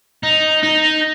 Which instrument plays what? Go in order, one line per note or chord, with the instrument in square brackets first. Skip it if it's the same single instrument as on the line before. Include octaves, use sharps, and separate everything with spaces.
[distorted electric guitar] D#4
D#4